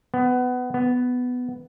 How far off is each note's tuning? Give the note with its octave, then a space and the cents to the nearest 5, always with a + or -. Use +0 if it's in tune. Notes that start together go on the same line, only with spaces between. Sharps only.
B3 +20
B3 +10